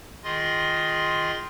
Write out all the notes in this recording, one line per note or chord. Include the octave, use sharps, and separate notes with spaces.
D#3 F4 G#4 D#5 C6